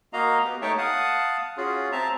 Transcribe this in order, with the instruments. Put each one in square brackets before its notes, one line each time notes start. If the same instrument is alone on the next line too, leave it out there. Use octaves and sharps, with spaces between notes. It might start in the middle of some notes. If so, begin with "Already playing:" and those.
[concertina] A#3 F#4 D#5 F5 A#5
B3 G4
A3 D#4 C#5 E5 G5 A5
F5 F#5 A5 D#6
C#4 F4 F#4 G#4
C4 E5 A5 A#5